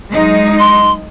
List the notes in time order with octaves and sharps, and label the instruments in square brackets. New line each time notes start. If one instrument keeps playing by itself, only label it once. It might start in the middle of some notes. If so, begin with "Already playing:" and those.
[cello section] F#3 G#3 D#4
[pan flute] C6